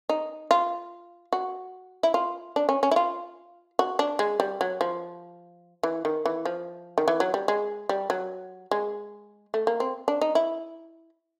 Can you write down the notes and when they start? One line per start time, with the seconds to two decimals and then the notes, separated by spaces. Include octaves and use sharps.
0.09 D#4
0.51 F4
1.33 F#4
2.03 E4
2.14 F4
2.56 D4
2.69 C#4
2.83 C#4
2.91 E4
2.96 F4
3.79 F#4
3.99 D4
4.19 G#3
4.40 G3
4.61 F#3
4.81 F3
5.83 E3
6.05 D#3
6.25 E3
6.45 F3
6.98 D#3
7.08 E3
7.20 F#3
7.34 G3
7.48 G#3
7.89 G3
8.10 F#3
8.71 G#3
9.54 A3
9.67 A#3
9.80 C4
10.08 D4
10.21 D#4
10.35 E4